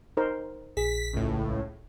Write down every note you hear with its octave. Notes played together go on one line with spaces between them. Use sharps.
D#4 A#4 C5
A#1 G#4 B6
C#2 A2